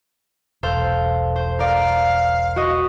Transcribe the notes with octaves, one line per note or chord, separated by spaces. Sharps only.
E1 B1 A4 C5 F5
C5
A#4 D5 F5
F#4 D#5